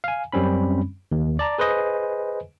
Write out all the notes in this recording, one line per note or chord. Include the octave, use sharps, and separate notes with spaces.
F5 G#5
F#2 G3 C4 C#4 B5
D#2
D5 A5 A#5
G#4 B4 C5 D#5 G#5